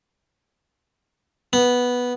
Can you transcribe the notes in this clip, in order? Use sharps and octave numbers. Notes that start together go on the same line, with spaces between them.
B3